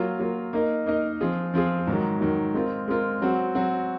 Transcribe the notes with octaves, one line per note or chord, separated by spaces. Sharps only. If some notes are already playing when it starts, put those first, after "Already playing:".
Already playing: F#3 A#3 F4
F#3 A#3 F4
A#3 D#4 A#4 D#5
A#3 D#4 A#4 D#5
F3 C4 F4 G#4
F3 C4 F4 G#4
G#2 D#3 F#3
G#2 D#3 F#3
G#3 C4 F4 A#4
G#3 C4 F4 A#4
F#3 C4 F#4
F#3 C4 F#4